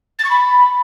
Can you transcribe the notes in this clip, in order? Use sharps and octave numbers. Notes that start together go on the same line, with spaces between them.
A6
C#6
B5